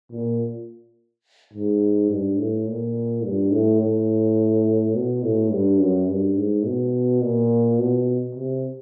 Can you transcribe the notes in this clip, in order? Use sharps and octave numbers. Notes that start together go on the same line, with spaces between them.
A#2
G#2
G2
A2
A#2
G2
A2
A2
B2
A2
G2
F#2
G2
G#2
B2
A#2
B2
C3